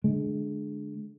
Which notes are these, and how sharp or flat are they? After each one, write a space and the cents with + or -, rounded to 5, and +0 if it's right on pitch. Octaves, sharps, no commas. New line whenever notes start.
D3 +0 G#3 +20